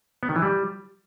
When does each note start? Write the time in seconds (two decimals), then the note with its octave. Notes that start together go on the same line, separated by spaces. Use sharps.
0.23 B3
0.29 D#3
0.36 E3
0.42 G3